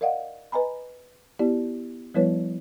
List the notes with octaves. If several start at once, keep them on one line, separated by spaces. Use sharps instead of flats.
A#4 D5 D#5 F5 F#5
B4 D#5 G#5 A#5 B5
B3 E4 G4 D5
F3 G3 B3 E4 B4 C#5